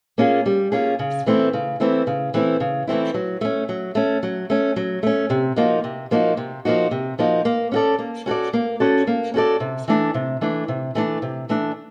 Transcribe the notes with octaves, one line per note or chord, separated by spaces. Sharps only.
A#3 C#4 F4 G#4
G3
A#3 C#4 F4 G#4
C#3
E3 A3 C4 E4
C#3
E3 A3 C4 E4
C#3
E3 A3 C4 E4
C#3
E3 A3 C4 E4
F#3
A3 C#4
F#3
A3 C#4
F#3
A3 C#4
F#3
A3 C#4
C3
F3 A#3 D#4 F#4
C3
F3 A#3 D#4 F#4
C3
F3 A#3 D#4 F#4
C3
F3 A#3 D#4 F#4
A#3
C#4 F#4 A4 D5
A#3
C#4 F#4 A4 D5
A#3
C#4 F#4 A4 D5
A#3
C#4 F#4 A4 D5
C3
E3 A3 D4
C3
E3 A3 D4
C3
E3 A3 D4
C3
E3 A3 D4